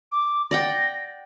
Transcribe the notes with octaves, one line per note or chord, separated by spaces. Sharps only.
D6
D5 F#5 G5 A#6